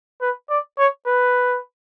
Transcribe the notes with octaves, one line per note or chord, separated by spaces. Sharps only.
B4
D5
C#5
B4